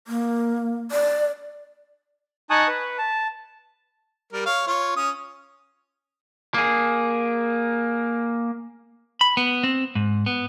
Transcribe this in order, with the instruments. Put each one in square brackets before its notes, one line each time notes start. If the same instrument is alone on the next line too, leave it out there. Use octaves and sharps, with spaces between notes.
[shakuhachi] A#3
D5
[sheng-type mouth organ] D#4 G#5 A5 C#6 D#6 F#6
B4
A5
[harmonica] G3 A#4
C#5 F5
F4 C#5
C#4 D#6
[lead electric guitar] A#3 G#4
[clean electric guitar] B5
B3
C4
G#2
B3